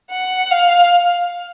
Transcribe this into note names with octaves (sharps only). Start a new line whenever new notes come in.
F#5
F5